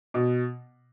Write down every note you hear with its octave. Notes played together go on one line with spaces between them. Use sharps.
B2